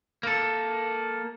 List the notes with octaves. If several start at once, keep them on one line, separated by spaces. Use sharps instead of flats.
A#3 A4